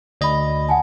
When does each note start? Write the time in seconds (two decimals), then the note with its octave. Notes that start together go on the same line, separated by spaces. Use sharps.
0.21 D2 D5 D#5 B5
0.69 F#5 G#5 A5